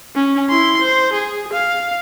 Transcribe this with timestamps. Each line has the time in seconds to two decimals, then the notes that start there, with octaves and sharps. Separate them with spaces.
0.16 C#4
0.50 E4 C6
0.81 C5
1.13 G#4
1.53 F5